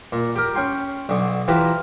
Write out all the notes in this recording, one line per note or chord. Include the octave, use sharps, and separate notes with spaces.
A#2
G4 A#4
C#4 G5 C6
B1 D3
E3 F4 G4 B4 C5 A#5